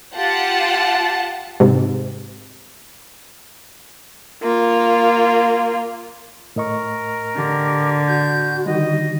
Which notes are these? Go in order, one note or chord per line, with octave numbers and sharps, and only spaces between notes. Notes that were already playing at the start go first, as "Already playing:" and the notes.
F4 G4 F#5 A5
G#2 C3
A#3 F4
A2 A#4 D#5 C#6
D3 G4
F#4 G6
D3 D#3 G3 D#5